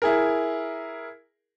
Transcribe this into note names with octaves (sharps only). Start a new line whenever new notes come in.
E4 G#4 A#4